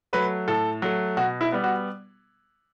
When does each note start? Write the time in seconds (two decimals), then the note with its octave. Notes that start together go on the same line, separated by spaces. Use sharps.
0.13 F#3 A3 B4
0.48 A2 A4
0.82 F#3 A3
1.17 B2 F#4
1.41 E4
1.52 G3 B3
1.64 F#4